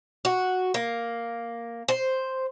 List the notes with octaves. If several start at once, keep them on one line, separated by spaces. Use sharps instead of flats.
F#4
A#3
C5